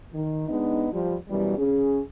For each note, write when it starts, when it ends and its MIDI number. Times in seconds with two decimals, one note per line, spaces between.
0.13 0.47 51
0.49 0.87 56
0.49 0.87 59
0.49 0.87 62
0.49 0.87 63
0.92 1.15 53
0.92 1.15 55
1.29 1.53 42
1.29 1.53 47
1.29 1.53 52
1.29 1.53 55
1.58 2.01 49
1.58 2.01 61
1.58 2.01 68